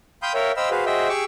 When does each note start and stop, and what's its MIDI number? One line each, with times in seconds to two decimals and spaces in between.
0.22 0.33 77
0.22 0.33 79
0.22 0.33 83
0.22 0.33 84
0.22 0.33 87
0.22 0.33 91
0.34 0.52 70
0.34 0.52 73
0.34 0.52 76
0.34 0.52 77
0.34 0.52 79
0.57 0.70 72
0.57 0.70 75
0.57 0.70 77
0.57 0.70 79
0.57 0.70 83
0.57 0.70 88
0.71 0.85 66
0.71 0.85 68
0.71 0.85 71
0.71 0.85 72
0.71 0.85 77
0.86 1.09 66
0.86 1.09 68
0.86 1.09 72
0.86 1.09 75
0.86 1.09 76
0.86 1.09 79
1.09 1.24 67
1.09 1.24 68
1.09 1.24 85
1.09 1.24 86
1.09 1.24 88